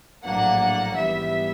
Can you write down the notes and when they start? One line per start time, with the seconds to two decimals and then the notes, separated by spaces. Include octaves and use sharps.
0.24 A#1 A2 F#3 A#3 D4 F#5
0.95 G#2 E3 G3 B3 E5